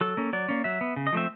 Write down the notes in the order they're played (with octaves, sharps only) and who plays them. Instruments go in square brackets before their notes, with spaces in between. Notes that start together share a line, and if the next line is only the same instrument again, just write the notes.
[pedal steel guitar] F#3 A4
A#3 C#4
F#3 D5
A#3 C#4
F#3 E5
B3
C#3
D#5
F3 A3 C4 E5